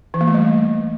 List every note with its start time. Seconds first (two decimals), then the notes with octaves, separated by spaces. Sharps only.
0.14 E3
0.21 A#3
0.28 A3
0.34 G3